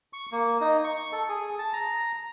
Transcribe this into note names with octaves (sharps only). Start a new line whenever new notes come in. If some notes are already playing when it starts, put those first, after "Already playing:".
C#6
A#3
D#4
C#6
A4
G#4
A5
A#5